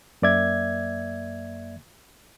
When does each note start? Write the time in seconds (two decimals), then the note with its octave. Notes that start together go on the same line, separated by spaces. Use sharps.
0.22 F#2 A#3 D5 E5 G#6